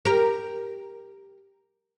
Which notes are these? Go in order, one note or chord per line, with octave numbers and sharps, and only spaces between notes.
G4 A#4